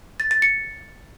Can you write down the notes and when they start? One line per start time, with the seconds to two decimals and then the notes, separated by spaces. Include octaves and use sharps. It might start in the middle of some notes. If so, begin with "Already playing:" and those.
0.20 A6
0.31 A6
0.42 C#7